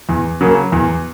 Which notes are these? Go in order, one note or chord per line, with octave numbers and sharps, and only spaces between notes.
E2
C#3 F#3 A#3
E2